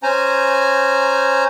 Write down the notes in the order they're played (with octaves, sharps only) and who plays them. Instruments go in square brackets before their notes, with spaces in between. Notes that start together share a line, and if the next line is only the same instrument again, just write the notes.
[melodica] C#4 C5 G#5 A#5